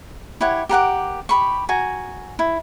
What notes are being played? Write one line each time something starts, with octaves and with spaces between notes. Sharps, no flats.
E4 G4 C#5 F#5
G4 A#4 F#5 D6
G4 B5 C#6
F#4 G#5 A#5
E4